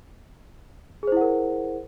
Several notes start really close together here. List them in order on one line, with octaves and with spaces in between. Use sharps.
G#4 C5 E4 F#5 A#4